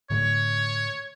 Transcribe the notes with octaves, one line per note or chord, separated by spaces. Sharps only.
A2 D3 A3 C#5